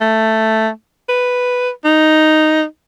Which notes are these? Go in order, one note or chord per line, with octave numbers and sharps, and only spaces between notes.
A3
B4
D#4